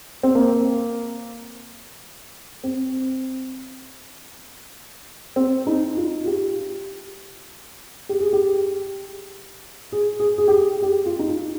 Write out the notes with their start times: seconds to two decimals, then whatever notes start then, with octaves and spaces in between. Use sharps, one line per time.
0.23 C4
0.35 A#3
2.64 C4
5.36 C4
5.67 D#4
5.97 F4
6.24 F4
6.27 G4
8.09 G4
8.21 G#4
8.33 G4
9.92 G#4
10.20 G#4
10.38 G#4
10.48 G4
10.58 G#4
10.83 G4
11.06 F4
11.19 D#4
11.28 F4